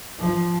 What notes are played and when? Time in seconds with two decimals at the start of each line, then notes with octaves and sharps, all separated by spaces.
0.19 F3